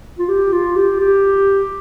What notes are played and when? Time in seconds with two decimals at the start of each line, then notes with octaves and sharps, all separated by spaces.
0.19 F4
0.29 G4
0.52 F4
0.76 G4
1.00 G4